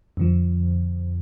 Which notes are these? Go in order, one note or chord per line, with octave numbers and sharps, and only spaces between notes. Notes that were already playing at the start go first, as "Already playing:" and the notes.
F2 D3 F3